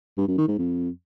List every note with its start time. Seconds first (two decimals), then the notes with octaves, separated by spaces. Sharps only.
0.18 G2
0.28 F#2
0.38 D#3
0.48 G#2
0.58 F2